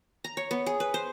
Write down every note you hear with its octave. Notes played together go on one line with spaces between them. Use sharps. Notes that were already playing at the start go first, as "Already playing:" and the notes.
A#5
C#5
B3
G#4
B4
C5